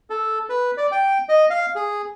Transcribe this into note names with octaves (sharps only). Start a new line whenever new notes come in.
A4
B4
D5
G5
D#5
F5
G#4